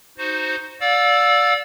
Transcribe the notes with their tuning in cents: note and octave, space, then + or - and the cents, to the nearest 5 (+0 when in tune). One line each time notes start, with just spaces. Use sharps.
D#4 +0 F#4 +0 C5 +0
D5 -10 F5 +35 E6 +0